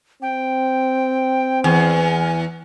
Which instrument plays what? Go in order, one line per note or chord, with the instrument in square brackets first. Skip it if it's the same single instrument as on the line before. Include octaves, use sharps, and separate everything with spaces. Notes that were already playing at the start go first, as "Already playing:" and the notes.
[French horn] C4 [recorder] G5
[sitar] E2 [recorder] G#5